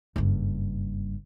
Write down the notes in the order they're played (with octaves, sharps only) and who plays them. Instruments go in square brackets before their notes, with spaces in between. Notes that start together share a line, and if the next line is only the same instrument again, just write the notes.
[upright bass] F#1 G2